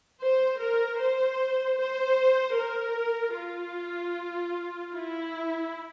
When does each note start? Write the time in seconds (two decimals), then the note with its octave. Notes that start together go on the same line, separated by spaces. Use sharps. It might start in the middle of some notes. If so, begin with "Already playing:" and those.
0.20 C5
0.59 A#4
1.00 C5
1.78 C5
2.56 A#4
3.36 F4
4.93 E4